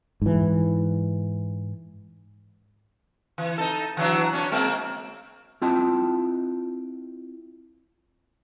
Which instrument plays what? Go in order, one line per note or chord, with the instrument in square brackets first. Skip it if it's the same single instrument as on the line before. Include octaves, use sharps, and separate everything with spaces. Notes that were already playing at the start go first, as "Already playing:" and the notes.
[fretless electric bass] G#2 E3
[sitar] E3
D#4 A4
E3 F#3 D4
C#4 D4 C#5
G#3 A#3 C4
[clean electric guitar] C4 E4 F4 D#5 G5 A5